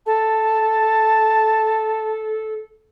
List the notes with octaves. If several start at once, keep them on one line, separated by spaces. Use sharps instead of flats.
A4 A5